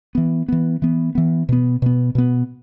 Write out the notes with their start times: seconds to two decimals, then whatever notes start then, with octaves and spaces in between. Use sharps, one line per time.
0.15 E3 B3
0.48 E3 B3
0.82 E3 B3
1.15 E3 B3
1.49 B2 B3
1.82 B2 B3
2.15 B2 B3